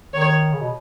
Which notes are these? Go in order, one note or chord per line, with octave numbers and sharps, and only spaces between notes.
D#3 C#5
C#3
B2